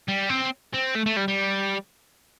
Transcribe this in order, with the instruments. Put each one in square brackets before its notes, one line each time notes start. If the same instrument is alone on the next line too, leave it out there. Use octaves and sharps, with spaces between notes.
[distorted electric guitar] G3
C4
C4
A3
A3
G3
G3